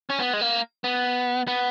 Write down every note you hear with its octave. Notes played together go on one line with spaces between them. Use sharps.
C#4
B3
G#3
A#3
B3
B3